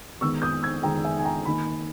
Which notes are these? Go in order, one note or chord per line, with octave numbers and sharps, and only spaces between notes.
D#3 G#3 B3 C#6 E6
D#6 G6
E6 G#6
D#3 G#3 B3 G5 A#5
E5 G#5
G#5
G5 A#5
D#3 A#3 D#4 G#5 B5